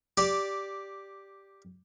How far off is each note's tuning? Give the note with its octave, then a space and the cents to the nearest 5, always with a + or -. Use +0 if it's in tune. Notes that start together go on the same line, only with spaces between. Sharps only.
G4 +0 D5 -5